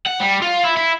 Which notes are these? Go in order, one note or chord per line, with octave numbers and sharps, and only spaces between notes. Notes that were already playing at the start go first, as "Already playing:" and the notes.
F#5
G3
F4
E4
E4